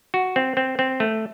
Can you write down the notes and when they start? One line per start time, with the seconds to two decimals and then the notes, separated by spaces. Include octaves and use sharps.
0.14 F#4
0.36 C4
0.57 C4
0.79 C4
1.00 A3